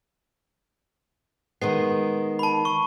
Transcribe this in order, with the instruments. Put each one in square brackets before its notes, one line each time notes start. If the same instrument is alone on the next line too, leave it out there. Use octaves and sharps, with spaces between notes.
[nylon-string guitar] D#3 G#3 B3 [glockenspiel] C7
[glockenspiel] A5 B5
C#6